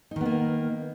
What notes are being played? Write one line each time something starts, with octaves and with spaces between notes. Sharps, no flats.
D#3 A#3 B3 D#4